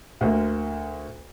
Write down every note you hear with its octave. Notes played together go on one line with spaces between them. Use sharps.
D2 A#3